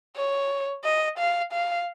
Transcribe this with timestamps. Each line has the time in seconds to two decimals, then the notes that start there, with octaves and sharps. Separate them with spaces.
0.16 C#5
0.84 D#5
1.18 F5
1.53 F5